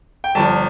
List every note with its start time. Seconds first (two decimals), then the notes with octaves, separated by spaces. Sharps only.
0.24 G5
0.35 G1 G2 F3 A5